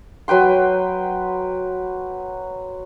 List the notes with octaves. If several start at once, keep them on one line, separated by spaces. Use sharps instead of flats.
F#3 B4 G5 C6